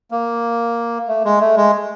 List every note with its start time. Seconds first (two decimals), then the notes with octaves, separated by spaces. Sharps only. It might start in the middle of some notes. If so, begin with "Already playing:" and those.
0.11 A#3
1.08 A3
1.25 G#3
1.41 A3
1.57 G#3